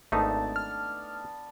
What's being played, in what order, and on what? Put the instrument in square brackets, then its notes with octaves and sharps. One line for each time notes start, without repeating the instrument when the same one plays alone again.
[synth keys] G#1 [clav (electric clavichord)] A3 D#4 [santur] B3 D4 D5 [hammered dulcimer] A5
[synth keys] F6